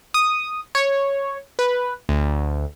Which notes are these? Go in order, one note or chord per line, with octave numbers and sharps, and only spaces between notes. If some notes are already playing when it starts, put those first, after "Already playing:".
D#6
C#5
B4
D2